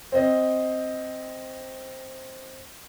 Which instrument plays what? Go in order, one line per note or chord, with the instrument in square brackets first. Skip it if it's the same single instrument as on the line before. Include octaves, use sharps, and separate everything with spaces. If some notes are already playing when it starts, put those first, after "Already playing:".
[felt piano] C4 D#5